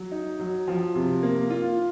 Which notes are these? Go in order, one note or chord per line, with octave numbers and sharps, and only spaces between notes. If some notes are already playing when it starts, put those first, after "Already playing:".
Already playing: F#3
D#4
F#3
F3
C3
A#3
F4